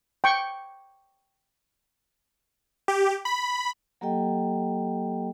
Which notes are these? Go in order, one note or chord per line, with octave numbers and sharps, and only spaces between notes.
G5 C#6
G4
B5
F#3 A#3 G4 A4 D#5 G5